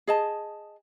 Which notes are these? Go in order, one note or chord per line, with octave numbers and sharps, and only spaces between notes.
G#4 D#5 A5